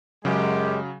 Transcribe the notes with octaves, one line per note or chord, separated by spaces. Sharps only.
F#2 C#3 F#3 G#3 G4